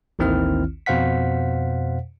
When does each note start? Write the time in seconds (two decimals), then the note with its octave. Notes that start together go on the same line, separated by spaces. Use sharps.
0.19 A1 D#2 D#3 C4 E4 F6
0.86 F2 B2 C5 F5 F#5 B6